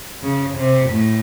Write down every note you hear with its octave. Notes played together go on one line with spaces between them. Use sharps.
C#3
C3
A2